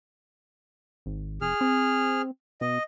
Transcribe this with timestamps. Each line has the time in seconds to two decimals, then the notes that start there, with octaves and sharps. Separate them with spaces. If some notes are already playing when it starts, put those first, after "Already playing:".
1.06 G#1
1.41 F1 G#4 F6
1.61 C4
2.61 B2 D#5